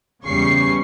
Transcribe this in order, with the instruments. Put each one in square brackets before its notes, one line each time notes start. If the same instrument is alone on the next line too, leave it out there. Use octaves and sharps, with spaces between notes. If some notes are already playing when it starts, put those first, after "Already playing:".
[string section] E2 C#3 G3 C#4 C#6 C7